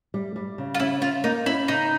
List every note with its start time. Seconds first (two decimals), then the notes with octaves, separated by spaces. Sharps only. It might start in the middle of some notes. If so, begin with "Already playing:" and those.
0.14 G3
0.36 G3
0.58 C#3
0.75 F4
0.80 C#4 E4
1.02 C#4 F4
1.24 A#3 D#4
1.46 C#4 E4
1.68 C#3 D#4